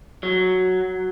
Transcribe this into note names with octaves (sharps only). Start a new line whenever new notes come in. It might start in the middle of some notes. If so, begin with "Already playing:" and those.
F#3